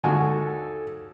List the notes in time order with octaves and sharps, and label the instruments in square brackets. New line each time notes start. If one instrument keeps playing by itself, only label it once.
[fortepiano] D#2 F#4 [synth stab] D3 G#3 [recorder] A4 [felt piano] G#5